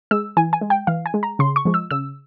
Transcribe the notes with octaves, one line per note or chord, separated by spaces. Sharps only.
G#3 E6
E3 G#5
G#5
G#3
G5
E3 F5
G#5
G#3
A#5
C#3 C6
C#6
F3 G#3
E6
C#3 E6